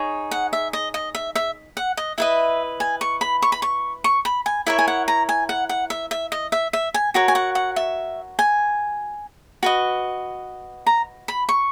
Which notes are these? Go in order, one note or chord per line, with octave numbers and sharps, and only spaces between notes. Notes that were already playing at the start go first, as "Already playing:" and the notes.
Already playing: D#4 G#4 C#5
F#5
E5
D#5
D#5
E5
E5
F#5
D#5
E4 B4 D#5 E5
G#5
C#6
B5
C#6
B5
C#6
C#6
B5
G#5
E4 A#4 C#5 E5
G#5
F#5
A#5
G#5
F#5
F#5
E5
E5
D#5
E5
E5
G#5
F#4 A#4 C#5 A#5
G#5
F#5
F#5
E5
G#5
F#4 B4 D#5
A#5
B5
C#6